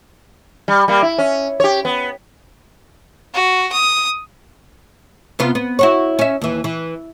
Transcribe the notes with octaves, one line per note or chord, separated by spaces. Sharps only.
G3
G3 A#3
E4
C#4
G4 C#5
B3
F#4
D#6
C3 B3 F4
B3
E4 F#4 C#5
C#4 E5
D#2 E3
E3